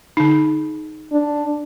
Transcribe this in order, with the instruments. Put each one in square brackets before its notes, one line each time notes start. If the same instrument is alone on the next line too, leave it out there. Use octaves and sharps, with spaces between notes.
[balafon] D3 D#4
[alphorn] D4